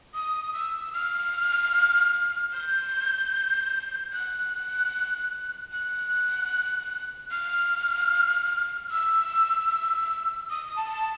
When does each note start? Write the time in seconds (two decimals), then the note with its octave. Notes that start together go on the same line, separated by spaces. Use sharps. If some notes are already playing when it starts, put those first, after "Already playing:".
0.14 D#6
0.54 E6
0.93 F6
2.53 G6
4.12 F#6
5.72 F#6
7.31 F6
8.91 E6
10.50 D#6
10.76 A5